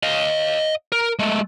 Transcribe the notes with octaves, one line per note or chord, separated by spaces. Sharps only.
D#5 F5
A#4
G#3 A3